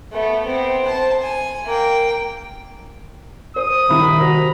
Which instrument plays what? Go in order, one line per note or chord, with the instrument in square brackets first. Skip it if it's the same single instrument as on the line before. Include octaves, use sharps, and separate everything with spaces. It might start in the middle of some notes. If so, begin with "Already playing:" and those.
[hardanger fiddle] A3 B3
B3 C4
C5 A5
G#5
A#3 G5
[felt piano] C5 [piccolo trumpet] D#6
[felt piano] D#1 C2 E4 [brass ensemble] D#3 [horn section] B5
[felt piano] F#4 C5 D#6 [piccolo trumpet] A#5